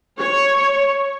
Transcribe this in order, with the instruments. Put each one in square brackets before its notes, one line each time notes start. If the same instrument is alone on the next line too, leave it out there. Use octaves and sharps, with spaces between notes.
[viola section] C#5